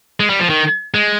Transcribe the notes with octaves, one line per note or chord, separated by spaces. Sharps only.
G#3
G3
F3
D#3
G#3